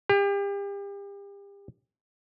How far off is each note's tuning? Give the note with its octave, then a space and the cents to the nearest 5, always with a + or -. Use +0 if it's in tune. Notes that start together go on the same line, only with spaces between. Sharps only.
G4 +35